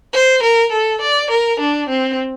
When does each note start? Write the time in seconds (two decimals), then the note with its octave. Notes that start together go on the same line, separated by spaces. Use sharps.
0.13 C5
0.43 A#4
0.72 A4
1.01 D5
1.30 A#4
1.60 D4
1.89 C4